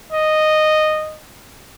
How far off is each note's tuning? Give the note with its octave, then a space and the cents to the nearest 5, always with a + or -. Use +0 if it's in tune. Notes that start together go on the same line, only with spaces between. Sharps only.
D#5 -10